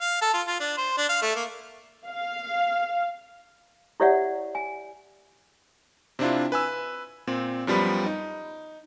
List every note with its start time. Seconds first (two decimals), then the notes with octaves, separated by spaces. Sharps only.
0.01 F5
0.21 A4
0.34 F4
0.47 F4
0.60 D4
0.77 C5
0.97 D4
1.09 F5
1.22 A3
1.36 A#3
2.08 F5
4.00 E4 G4 C#5 D5 E5 F#5
4.55 G#5
6.19 C3 C4 D4 E4 F4
6.52 B4 G#5 E6
7.27 A#2 C4
7.67 F#2 F3 G3 B3 B5
8.06 D#4